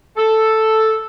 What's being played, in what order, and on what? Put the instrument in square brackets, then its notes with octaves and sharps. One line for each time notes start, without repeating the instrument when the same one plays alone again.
[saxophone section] A4